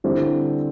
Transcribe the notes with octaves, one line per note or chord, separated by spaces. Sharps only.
D3 G3 C4 E4